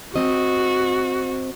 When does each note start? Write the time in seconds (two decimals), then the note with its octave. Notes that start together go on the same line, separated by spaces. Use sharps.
0.16 C4 F#4 D#5